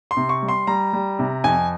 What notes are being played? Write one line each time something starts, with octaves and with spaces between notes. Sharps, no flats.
C6
C3
C#6
G3
C6
G3 A#5
G3
C3
F2 G#5